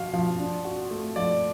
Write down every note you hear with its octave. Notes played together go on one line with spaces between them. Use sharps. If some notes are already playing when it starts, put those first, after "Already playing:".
Already playing: F3 F#4 F5
F3
D4
F#4
A3
F3 D5